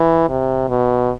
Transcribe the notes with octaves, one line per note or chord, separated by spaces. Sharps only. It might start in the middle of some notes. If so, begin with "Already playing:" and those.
Already playing: E3
C3
B2